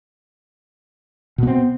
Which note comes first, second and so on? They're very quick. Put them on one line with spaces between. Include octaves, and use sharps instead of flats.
B2 B3 C4